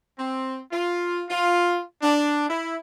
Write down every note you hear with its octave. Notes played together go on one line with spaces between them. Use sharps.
C4
F4
F4
D4
E4